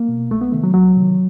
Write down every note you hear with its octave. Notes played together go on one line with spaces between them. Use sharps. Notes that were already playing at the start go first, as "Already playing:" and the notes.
Already playing: A#3
B2
C2 A3
B3
C3 D#3 A3
F#3
C2 F#3
C3 D#3